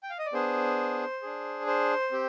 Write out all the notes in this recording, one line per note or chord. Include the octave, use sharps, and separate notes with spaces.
G5
F5
D#5
D5
B3 D4 G#4 C5
D4 G#4
C5
C4 G4